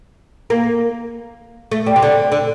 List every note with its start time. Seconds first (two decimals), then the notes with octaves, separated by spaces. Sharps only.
0.50 A#3
1.72 A3
1.86 G3
1.96 C3
2.02 D3
2.32 D3